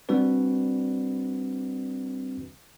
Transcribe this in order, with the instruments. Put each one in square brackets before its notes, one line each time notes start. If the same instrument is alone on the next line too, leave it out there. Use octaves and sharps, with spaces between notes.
[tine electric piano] G3 C4 D4 F#4 B4